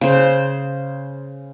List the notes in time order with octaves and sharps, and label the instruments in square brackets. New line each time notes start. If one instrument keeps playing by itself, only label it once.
[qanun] C#3 C5